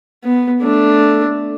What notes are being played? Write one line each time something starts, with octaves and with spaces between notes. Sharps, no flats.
B3
A3 D4